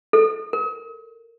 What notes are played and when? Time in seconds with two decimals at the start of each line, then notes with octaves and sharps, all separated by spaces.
0.13 A4
0.53 A#4